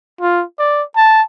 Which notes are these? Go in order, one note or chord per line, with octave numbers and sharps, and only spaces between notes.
F4
D5
A5